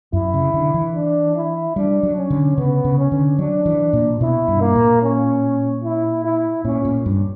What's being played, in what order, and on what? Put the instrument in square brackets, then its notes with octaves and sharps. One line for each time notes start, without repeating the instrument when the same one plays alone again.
[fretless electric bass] F#2 [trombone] E4
[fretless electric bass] C#3
D3
E3
[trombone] D4
E4
[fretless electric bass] G3 [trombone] D4
[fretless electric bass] F#3
[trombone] C#4
[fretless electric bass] D3
[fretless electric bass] C#3 [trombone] B3
[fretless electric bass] C#3
[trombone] C#4
[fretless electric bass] D3
[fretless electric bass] F#3 [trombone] D4
[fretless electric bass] E3
A#2
[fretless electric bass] B2 [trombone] E4
[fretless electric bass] G2
[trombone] A#3
[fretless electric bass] A#2
[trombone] C#4
E4
E4
[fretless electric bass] A#2 [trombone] C#4
[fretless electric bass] A#2
G2